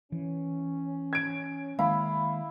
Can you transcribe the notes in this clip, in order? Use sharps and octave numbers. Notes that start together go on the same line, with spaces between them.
E3 C#4
G#6 D7
D#3 G#3 A#3 E4 F5 B5